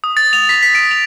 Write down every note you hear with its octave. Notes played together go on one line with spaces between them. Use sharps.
D#6
A6
F7
B6
B6
D7
F7